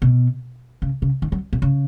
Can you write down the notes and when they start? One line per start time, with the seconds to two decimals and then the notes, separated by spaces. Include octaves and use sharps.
0.02 B2
0.82 C#3
1.02 C#3
1.22 D#3
1.32 F#3
1.53 A#2
1.62 C#3